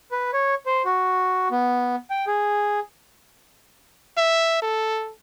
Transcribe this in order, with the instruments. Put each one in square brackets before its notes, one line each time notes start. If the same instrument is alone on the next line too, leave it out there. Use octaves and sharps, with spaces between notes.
[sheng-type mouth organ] B4
C#5
C5
F#4
B3
G5
G#4
[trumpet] E5
A4